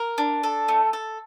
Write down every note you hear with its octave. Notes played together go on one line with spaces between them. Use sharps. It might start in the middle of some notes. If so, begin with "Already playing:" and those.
Already playing: A#4
D4
A4
A3
A4